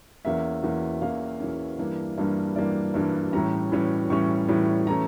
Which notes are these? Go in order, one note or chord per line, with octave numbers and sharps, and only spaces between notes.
E2 E3 A#3 C#4 E5
E2 E3 A#3 C#4
E2 E3 A#3 C#4 F5
E2 E3 A#3 C#4
G2 E3 G3 A#3 D4
G2 E3 G3 A#3 D4
G2 E3 G3 A#3 D4 D5
G2 E3 G3 A#3 D4
A2 E3 G3 C#4 A#5
A2 E3 G3 C#4
A2 E3 G3 C#4 C#6
A2 E3 G3 C#4
E3 A3 C#4 A#5